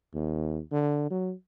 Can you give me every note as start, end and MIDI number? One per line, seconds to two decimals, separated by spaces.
0.14 0.60 39
0.71 1.06 50
1.11 1.33 54